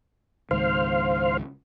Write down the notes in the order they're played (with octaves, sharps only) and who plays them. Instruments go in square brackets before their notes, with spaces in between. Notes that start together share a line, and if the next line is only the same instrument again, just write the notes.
[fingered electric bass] C#2 G#2 D#3 [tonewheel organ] C5 F5